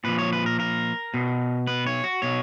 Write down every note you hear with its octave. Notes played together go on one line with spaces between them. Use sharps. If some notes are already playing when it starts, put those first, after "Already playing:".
A#2 F3 B4
C#5
B4
A#4
A#4
B2
B4
C#5
F#4
B2 C#5